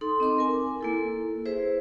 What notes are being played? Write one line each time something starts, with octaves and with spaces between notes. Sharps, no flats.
D#4 A4 C6
C4 D#5 C6 D6
A#4 G#5
A#3 E4 A4
E4 G#4 B4 C5 E5